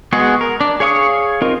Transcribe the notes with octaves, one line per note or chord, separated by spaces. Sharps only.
G#3 B3 F#4 G#4
A#4
D4
G#4 C#5 F5 C#6 D#6
C4 D#4 F4 A#4